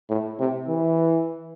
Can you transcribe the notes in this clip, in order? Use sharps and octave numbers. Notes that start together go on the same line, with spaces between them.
A2
C3
E3